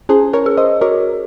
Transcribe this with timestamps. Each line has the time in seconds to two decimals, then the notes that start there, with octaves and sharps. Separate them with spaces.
0.09 C#4 G#4 C5
0.33 A#4 C#5
0.46 G#4
0.58 C5 D#5
0.81 F#4 A#4 C#5